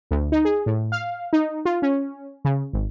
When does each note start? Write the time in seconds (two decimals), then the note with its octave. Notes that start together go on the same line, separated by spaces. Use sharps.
0.11 D2
0.32 D#4
0.45 G#4
0.66 A2
0.92 F5
1.33 D#4
1.65 F4
1.82 C#4
2.45 C#3
2.73 G#1